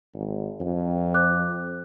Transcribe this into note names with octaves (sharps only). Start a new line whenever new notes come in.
G#1
F2
C5 D6 F#6